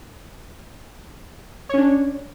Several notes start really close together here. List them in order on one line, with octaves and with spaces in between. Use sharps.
C#5 C#4 D4